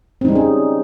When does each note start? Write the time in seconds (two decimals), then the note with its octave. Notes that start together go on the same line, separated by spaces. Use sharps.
0.21 C4
0.25 D#4
0.28 G3
0.32 C#4
0.35 G#4